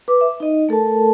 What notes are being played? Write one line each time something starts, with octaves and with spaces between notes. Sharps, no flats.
B4 D6
E5
D#4 D#5
A3 A4 A#4 A5